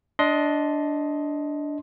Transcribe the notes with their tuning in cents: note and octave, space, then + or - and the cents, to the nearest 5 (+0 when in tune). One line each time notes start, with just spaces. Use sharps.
D4 -5 D#5 +15 C6 +0